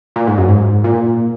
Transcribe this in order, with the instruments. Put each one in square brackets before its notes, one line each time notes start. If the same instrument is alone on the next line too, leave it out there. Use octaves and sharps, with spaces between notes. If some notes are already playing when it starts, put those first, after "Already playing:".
[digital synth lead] A#2
G#2
F#2
G#2
A#2